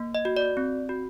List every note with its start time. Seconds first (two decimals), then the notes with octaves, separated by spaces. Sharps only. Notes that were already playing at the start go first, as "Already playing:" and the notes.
Already playing: A#3
0.15 D#5
0.25 F#4
0.37 D5
0.57 C4
0.89 F#4